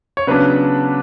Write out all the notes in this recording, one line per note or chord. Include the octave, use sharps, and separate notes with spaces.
C#5
C#3 F#3 B3 D4 B4